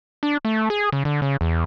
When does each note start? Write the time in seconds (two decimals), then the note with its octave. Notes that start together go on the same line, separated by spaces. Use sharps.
0.23 D4
0.45 A3
0.70 G#4
0.92 C#3
1.05 D3
1.22 C#3
1.41 E2